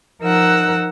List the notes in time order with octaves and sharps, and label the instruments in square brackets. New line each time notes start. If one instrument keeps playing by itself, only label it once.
[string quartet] F3 D#4 A#4 F#5 E6 F#6